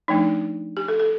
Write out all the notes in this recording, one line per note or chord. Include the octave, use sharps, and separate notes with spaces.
F3 A3 D4 D#4
G4
A4
A4